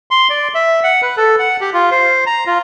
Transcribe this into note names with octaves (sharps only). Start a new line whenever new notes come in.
C6
D5
E5
F#5
B4
A4
F#5
G4
F4
C5
A#5
F4